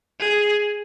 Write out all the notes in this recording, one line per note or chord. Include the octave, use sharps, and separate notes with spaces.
G#4